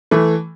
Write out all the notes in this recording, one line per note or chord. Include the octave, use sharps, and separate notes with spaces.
E3 A3